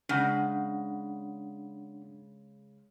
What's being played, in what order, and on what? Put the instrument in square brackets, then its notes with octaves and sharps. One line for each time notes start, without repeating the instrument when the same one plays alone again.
[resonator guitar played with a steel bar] C#3 G#3 [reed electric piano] D4 F#5